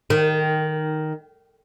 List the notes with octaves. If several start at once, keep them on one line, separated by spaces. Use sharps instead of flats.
D#3